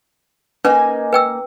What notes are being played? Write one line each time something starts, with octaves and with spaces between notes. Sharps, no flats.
A#3 C#4 D#4 B4 G#5
B4 G5 E6